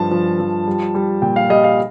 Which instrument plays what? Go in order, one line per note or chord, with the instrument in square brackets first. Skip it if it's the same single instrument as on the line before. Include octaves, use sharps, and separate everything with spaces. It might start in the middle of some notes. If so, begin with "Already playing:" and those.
Already playing: [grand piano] G2 F3 A5
F3
F3
G3
G3
A#2 G5
F5
G3 D#5
F5